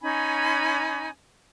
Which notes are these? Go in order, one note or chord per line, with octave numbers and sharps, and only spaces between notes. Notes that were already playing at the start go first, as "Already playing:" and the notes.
C#4 D#4 G#5 B5